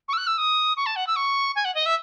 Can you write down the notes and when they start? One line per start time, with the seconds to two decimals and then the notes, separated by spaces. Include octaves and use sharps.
0.08 C#6
0.13 E6
0.17 F#6
0.27 E6
0.38 D#6
0.77 C#6
0.86 A5
0.96 F#5
1.07 E6
1.16 C#6
1.56 G#5
1.65 F#5
1.75 D#5
1.86 E5